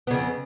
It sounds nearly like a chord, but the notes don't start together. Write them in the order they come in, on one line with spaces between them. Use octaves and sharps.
B3 C#3 F2